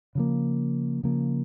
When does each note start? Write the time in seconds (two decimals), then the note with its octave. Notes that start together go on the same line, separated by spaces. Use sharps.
0.15 C#3 F3 A#3
1.03 C#3 F3 A#3